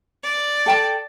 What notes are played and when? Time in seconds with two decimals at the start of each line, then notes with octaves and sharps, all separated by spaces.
0.23 D5
0.66 A4 G5 A5